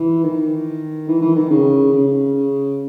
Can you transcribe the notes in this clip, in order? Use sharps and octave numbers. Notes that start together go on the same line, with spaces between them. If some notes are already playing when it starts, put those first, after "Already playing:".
Already playing: E3
D#3
E3
E3
D#3
C#3
C#3